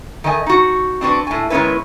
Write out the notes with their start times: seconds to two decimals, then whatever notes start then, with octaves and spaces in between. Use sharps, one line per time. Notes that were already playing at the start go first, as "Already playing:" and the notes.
0.24 D#3 A3 D#5 G#5
0.46 D#4 F#4
1.01 C4 D4 F#4 B4
1.27 A2 G#5
1.50 D#3 G#3 B3 C#4 E4 B4